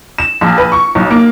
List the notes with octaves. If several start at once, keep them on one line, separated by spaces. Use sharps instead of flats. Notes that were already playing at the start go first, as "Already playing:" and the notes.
E7
A#1
B4
C#6
B1
A#3